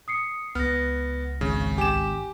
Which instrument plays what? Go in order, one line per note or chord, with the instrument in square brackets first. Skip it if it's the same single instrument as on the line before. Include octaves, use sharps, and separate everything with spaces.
[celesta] D#6 C7 C#7
[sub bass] C#2 [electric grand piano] B3 [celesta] F6 A#6
[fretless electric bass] G#1 [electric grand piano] C#3
[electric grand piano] G4 E7 [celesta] G#5 D6